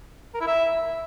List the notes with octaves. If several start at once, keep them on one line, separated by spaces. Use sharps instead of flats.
A#4
E4
E5